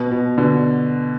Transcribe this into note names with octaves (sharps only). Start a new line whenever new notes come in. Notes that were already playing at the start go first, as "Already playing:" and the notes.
Already playing: B2
B2
B2 D3